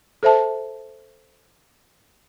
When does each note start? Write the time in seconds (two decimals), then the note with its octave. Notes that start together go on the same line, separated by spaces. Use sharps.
0.23 A4 C5 E5 A5